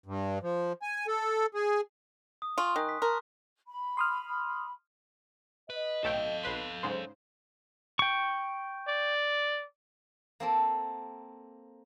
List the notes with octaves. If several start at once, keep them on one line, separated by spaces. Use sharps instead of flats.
G2
F3
G#5
A4
G#4
D#6
F4 G#5 C6 C#6
D#3 G#5 D#6 F#6
B6
A#4 A5 C6
B5
C6 D#6 F6
B4 D#5
B1 A3 A4 F5 G5
B1 B4 C6
G#2 C#3 C5
G5 C#6
D5
A#3 C4 A4